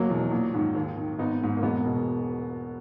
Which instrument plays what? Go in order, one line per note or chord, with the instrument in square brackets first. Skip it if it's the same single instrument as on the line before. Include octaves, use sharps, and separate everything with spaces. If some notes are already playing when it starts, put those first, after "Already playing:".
Already playing: [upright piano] F#1 F#3 A#3
E2 B2
A#1
G#2 D#3
D#2
D#3
G#1 B3 D#4
G#2 D#3
A#3
E1 G#3 B3
B2